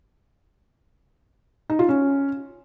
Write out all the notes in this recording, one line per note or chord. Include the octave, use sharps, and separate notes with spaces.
D#4
F4
C#4